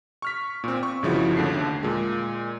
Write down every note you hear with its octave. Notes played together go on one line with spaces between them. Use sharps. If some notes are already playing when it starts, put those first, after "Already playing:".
C#6 F6 B6
A#2 C4
C#6
G1 C#3 F3 E4 F#4
D#2 D3 A3 C7
A#2 G#3